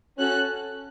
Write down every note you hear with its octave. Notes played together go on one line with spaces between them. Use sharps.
C#4 F#4 A4 F#6